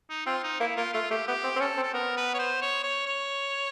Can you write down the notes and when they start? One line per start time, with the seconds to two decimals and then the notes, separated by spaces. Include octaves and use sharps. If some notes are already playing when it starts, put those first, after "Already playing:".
0.09 D#4
0.26 C4 F4
0.43 D#4
0.60 A#3 E4
0.76 A#3 F4
0.93 A3 F4
1.10 A3 G4
1.27 B3 G4
1.44 C4
1.56 C4
1.61 C#4 A4
1.77 C4
1.83 A4
1.94 B3 A#4
2.17 B4
2.34 C#5
2.39 C5
2.62 C#5
2.83 C#5
3.06 C#5